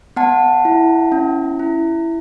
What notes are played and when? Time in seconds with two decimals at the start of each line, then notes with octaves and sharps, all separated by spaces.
0.16 B3 F#5 A5
0.65 E4
1.12 C#4
1.59 E4